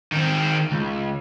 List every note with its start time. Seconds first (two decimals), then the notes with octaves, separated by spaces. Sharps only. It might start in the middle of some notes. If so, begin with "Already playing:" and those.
0.12 D#3 C4
0.71 C#2